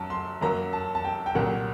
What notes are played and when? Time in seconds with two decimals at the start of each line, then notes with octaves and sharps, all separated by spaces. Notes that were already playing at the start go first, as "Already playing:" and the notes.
Already playing: F#2 F#3 A5
0.10 C6
0.41 F#2 F#3 A#3 A#5
0.73 A5
0.95 A5
1.04 G5
1.26 G5
1.35 C2 A#2 F#3 A#3 F#5